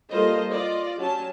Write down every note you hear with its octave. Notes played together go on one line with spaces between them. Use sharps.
G3 A#3 F4 A4 C5 D#5
F4 D5 D#5
F#3 C#4 G4 A5